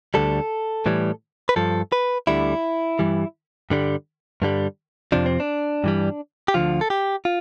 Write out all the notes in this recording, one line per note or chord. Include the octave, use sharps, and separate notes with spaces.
D2 D3 G3 A4
A2 E3 G3
B4
G2 F3 A4
B4
D2 D3 G3 E4
G2 E3 G3
G2 D3 G3
G2 D3 G3
F2 C3 F3 D4
C4
D4
G2 E3 G3
G4
D2 D3 F3 F4
A4
G4
F4